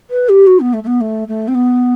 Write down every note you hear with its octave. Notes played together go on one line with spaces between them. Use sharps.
B4
G4
F#4
B3
A3
A3
B3
A3
A3
C4
B3